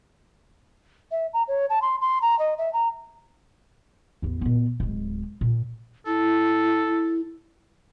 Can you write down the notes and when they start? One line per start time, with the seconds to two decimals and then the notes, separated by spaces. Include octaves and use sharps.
1.12 E5
1.34 A#5
1.48 C#5
1.70 A5
1.82 C6
2.01 C6
2.22 A#5
2.39 D#5
2.58 E5
2.73 A#5
4.22 A1 E2
4.41 A#2 B3
4.80 D1 G#3
5.41 A#2
6.07 E4 A4